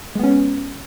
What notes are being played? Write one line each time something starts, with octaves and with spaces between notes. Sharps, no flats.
G#3 B3 C#4